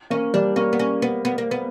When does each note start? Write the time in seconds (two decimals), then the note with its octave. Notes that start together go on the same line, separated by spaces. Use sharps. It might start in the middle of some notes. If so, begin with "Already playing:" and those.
0.10 A#3 C#4
0.34 G3 D4
0.56 A#3 C#4
0.73 B3
0.79 C#4
1.02 B3
1.25 B3
1.38 A#3
1.51 B3